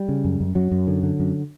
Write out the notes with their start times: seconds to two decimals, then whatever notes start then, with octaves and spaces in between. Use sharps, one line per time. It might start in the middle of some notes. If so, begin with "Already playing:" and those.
Already playing: G3
0.09 C#3
0.24 F#2
0.41 F#2
0.55 F#2 F#3
0.72 F#2
0.87 D3
1.03 D3
1.20 F#2